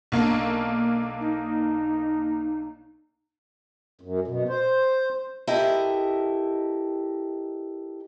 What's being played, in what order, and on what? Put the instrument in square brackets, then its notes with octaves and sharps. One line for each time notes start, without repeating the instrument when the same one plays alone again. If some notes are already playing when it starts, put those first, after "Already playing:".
[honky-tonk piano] B1 A#3 D4
[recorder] D#4
[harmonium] F#2
B2
C5
[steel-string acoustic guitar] E4 G4 A4 A#4 D#5